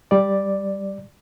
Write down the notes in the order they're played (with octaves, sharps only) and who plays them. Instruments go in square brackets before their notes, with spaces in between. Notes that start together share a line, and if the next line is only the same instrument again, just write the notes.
[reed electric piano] G3 D5